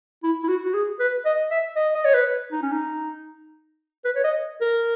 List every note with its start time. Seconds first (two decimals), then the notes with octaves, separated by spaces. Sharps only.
0.23 E4
0.44 E4
0.48 F#4
0.65 F#4
0.74 G#4
1.00 B4
1.26 D#5
1.51 E5
1.76 D#5
1.95 D#5
2.05 C#5
2.14 B4
2.52 D#4
2.62 C#4
2.72 D#4
4.05 B4
4.16 C#5
4.24 D#5
4.61 A#4